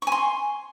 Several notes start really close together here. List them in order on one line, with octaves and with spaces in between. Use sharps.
C#6 G#5 C6